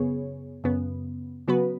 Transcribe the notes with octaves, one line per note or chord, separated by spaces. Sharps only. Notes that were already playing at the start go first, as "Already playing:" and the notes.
Already playing: F#2 C#3 B3 G#4 C#5
F#2 C#3 B3
C#3 F#3 B3 F#4 B4